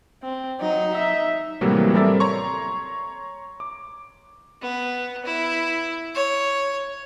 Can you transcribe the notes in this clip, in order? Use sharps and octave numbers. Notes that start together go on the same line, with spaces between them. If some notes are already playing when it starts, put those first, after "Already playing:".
C4
F#3 D#4
E5
A2 C3 E3 F#3 G3 A#3
G3 C4 A4 A#4 D5 E5
C#5 A#5 C6 C#6
D6
B3
E4
C#5